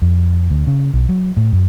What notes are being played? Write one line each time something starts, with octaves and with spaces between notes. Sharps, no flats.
F2
D2
C#3
B1
F#3
A2
F#2